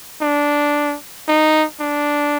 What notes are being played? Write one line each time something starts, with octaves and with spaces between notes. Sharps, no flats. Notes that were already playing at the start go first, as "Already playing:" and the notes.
D4
D#4
D4